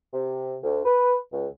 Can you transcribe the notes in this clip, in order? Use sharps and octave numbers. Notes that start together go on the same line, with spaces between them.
C3
D2
B4
C#2